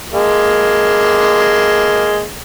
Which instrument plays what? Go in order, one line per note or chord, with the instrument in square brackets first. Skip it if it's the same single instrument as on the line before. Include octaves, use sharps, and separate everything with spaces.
[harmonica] G#3 A#3